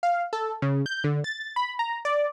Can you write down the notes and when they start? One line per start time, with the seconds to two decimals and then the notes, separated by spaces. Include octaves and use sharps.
0.03 F5
0.33 A4
0.62 C#3
0.86 G6
1.04 D3
1.24 A6
1.56 B5
1.79 A#5
2.05 D5